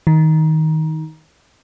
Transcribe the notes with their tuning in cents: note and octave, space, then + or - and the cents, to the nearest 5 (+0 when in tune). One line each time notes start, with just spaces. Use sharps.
D#3 +20